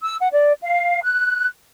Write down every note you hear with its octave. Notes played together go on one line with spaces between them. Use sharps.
E6
F#5
D5
F5
F#6